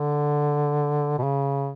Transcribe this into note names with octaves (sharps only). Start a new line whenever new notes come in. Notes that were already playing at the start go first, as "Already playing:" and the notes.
Already playing: D3
B2
C#3